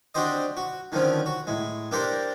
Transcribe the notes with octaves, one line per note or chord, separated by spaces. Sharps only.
C4 D4 F#4 G4 C5 D#5
F#4
D3 D#3 F3 C4 C#4
F#4
A2 G#3
A#3 D4 G4 A4 A#4 C5